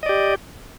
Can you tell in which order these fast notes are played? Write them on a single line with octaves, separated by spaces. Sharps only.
D#5 D5 G4